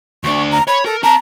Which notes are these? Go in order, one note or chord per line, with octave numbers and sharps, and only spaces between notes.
D2 D4 C#6
A#5
C#5 B5
A4 A#4
C4 A5 A#5